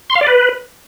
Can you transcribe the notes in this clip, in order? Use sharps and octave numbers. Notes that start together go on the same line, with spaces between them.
C6
F5
D5
B4